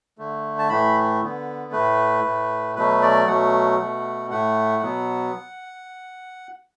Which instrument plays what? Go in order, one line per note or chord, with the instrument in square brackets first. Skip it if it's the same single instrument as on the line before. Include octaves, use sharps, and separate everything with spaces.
[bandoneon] D3 A3
A5
A2 E3 A3 B5
D3 B3
A2 A3 B4
A2 A3
B2 F#3 A3 B4
D5
B2 F#3 A3 F#5
B2 A3
A2 A3 F#5
B2 F#3 B3